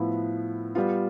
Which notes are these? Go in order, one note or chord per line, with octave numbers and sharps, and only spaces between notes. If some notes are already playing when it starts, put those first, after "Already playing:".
Already playing: A2 F3 B3 E4
G3 B3 F4